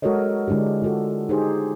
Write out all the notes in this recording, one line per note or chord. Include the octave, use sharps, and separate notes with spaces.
G#3 F#4 A4 A#4 C#5 D#5
D3 G#3 D4 E4 G4
F4 F#4 A4
D#4 G4 G#4 C5